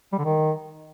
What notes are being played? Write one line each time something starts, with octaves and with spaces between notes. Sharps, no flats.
G3
D3
D#3